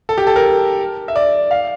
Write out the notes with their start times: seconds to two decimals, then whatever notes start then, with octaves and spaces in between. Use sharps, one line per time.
0.09 A4
0.18 G4
0.27 A4
0.36 A#4
1.08 E5
1.16 D5
1.51 F5